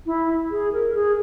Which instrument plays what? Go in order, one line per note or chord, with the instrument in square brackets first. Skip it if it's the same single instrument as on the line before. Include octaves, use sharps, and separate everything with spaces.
[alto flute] E4
G#4
A#4
G#4